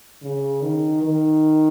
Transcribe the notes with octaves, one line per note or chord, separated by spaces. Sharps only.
C#3
D#3
D#3